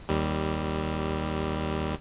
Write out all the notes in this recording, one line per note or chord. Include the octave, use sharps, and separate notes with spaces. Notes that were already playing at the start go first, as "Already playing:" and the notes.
D#2 G3